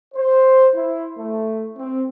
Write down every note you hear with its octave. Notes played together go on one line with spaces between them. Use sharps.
C5
E4
A3
C4